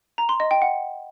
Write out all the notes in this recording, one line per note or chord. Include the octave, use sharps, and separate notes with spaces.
A#5
C6
D#5
G5
F#5